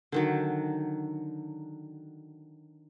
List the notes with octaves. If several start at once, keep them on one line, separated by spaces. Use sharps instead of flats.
D3 D#3 F#3